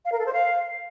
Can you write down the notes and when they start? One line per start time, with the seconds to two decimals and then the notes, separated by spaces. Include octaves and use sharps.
0.05 F5
0.12 A#4
0.19 A4
0.26 C5
0.33 F5